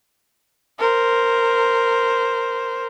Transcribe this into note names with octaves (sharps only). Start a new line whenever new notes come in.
A#4 C5